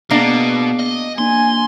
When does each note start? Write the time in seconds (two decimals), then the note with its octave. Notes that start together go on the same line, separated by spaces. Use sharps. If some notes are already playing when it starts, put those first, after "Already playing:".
0.11 B2 A#3 B3 D4 G#4 D5 C7
0.79 D#5
1.18 A#3 D4 G#5 C6